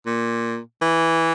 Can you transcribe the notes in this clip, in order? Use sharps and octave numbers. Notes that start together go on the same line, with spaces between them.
A#2
E3